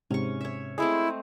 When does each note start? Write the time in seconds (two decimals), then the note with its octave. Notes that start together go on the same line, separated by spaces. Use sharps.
0.11 G#2 C3 C#4 C#6
0.41 C#5 E5
0.78 G#3 A3 C4 E4 G#4